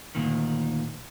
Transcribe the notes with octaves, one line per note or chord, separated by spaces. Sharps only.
D2 A#2 D#3